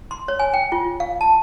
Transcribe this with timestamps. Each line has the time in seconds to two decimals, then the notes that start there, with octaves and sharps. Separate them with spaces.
0.11 C6
0.28 C#5
0.39 G#5
0.54 G5
0.72 F4
1.00 F5
1.21 A5